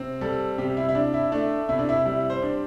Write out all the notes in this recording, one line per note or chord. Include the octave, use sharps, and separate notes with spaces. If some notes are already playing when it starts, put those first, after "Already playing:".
Already playing: C3 C4
G3 A4
C3 G4
E4
E4
D4
E4
A3 D4
C3 E4
D4
E4
G3 E4
C5
D4